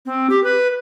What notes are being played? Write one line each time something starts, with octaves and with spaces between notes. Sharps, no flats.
C4
G4
B4